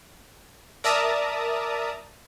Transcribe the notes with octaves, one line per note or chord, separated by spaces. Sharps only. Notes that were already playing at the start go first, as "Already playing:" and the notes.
A#4 D5 E5 A5 A#5 D#6